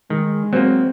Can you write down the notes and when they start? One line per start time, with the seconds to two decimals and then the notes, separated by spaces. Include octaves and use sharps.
0.10 D#3 G#3
0.53 F#3 A#3 C4